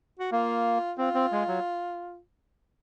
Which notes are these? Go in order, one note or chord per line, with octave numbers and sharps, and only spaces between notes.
F#4
A#3 F4
C4 F4
C4
G#3
F#3